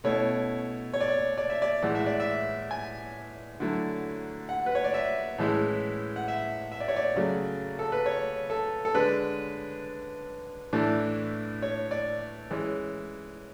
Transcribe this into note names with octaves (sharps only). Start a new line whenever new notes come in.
B2 A3 C#4 E4 C#5
C#5
D5
C#5
D5
E5
D5
A2 E3 G#3 F#5
E5
D5
E5
G#5
D3 F#3 A3 E4
F#5
B4
C#5
D5
E5
A2 E3 G#3 C#4 E4
F#5
E5
E5
D5
C#5
D5
C#3 F#3 A3
A4
B4
C#5
A4
A4
D3 G#3 D4 B4
A2 E3 A3 D4
C#5
D5
E3 G#3 C#4